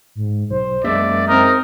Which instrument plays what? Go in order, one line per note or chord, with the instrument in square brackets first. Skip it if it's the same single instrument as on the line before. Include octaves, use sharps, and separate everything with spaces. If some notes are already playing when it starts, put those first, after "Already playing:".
[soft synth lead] G#2
[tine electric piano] B1 [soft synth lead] C5
[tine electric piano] F#2 G#3 E5 [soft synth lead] A#3 [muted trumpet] D5
[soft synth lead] C4 [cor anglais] D#4 [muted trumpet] A#4